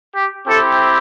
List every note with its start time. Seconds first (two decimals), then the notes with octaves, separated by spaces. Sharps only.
0.14 G4
0.47 C4 E4 G4 A4